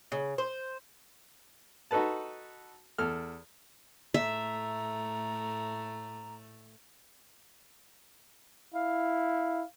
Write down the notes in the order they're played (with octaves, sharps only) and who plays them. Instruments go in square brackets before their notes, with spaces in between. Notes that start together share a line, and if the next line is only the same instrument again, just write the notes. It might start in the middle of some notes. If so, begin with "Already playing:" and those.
[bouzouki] C#3
C5
[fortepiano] D#4 F#4 A4 B4 A5
E2 A4 F6
[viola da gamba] A2 A3 [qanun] E5 [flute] A#5
[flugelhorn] E4 [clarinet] F5